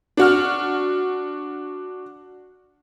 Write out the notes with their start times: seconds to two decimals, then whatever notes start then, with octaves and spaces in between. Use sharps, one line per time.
0.17 D4 F#4 F6